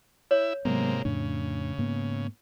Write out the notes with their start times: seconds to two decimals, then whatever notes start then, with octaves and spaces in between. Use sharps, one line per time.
0.31 E4 C#5 E5
0.65 G#2 C3 F#3 G#3 A#3 B3
1.05 F2 A2 C#3 D4
1.78 G#2 A#3 B3